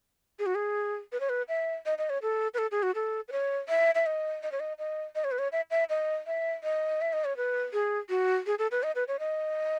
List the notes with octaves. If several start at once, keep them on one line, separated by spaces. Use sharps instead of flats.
G#4
F#4
G#4
B4
C#5
B4
E5
D#5
D#5
C#5
A4
B4
A4
G#4
F#4
A4
B4
C#5
E5
E5
D#5
D#5
C#5
D#5
D#5
D#5
C#5
B4
C#5
E5
E5
D#5
E5
D#5
E5
D#5
C#5
B4
G#4
F#4
G#4
A4
B4
D#5
B4
C#5
D#5